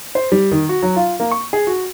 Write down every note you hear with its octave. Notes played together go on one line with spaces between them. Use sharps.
C5
G3
D#3
F#4
F#3
F4
A#3
C#6
G#4
F#4